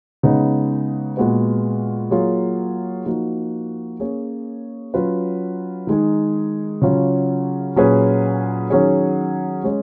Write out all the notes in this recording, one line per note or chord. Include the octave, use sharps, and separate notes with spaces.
C#3 G#3 B3 D#4
A#2 G#3 B3 F#4 B4
F#3 A#3 F4 G#4 C#5
F3 A#3 D#4 F#4
A#3 C#4 G#4 C#5
F#3 C#4 F4 B4
D#3 G#3 D#4 G#4
C#3 F#3 C#4 F4
A#2 F#3 C#4 G#4 B4
D#3 F#3 C#4 G#4 C#5
G#3 C#4 G#4